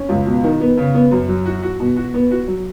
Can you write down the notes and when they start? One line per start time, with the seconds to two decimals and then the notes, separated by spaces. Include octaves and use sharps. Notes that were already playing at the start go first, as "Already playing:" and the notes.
Already playing: C#4
0.09 C#2
0.26 B2
0.44 D#3
0.60 B3
0.77 C#3
0.94 B3
1.11 F#2
1.28 F#3
1.46 F#4
1.63 F#4
1.80 B2
1.96 F#4
2.14 B3
2.31 F#4
2.47 F#3